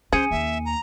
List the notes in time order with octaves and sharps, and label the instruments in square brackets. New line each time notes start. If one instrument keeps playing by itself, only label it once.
[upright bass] C#4 [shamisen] G#4 [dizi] C5 [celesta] G#5 C#7 D#7
[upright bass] D#2 A#3 [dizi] E5
[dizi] A#5